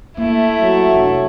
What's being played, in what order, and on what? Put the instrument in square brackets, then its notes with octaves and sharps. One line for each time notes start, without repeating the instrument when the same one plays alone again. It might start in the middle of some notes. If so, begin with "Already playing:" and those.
[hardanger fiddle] A3 E4 [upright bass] A#3
[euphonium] F#3
[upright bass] F1 D4